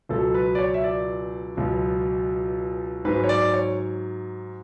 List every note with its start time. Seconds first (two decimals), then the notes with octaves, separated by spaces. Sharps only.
0.09 C#2 B2 F#3 A4
0.34 B4
0.55 D5
0.59 C#5
0.74 E5
0.84 D5
1.57 C#2 B2 F#3
3.05 G#2 F#3 B4
3.24 C#5
3.29 D5
3.54 C#5